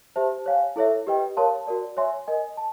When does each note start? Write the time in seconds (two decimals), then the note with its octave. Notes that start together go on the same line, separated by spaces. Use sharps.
0.16 G4 C5 E5 A5
0.46 C#5 F5 G#5
0.76 E4 A4 C#5 E5
1.07 G4 B4 D#5 G5
1.37 A#4 C#5 F5 A5 C6
1.67 F#4 A#4 D5
1.97 C#5 E5 G#5 C6
2.27 A#4 D#5 G#5
2.57 A5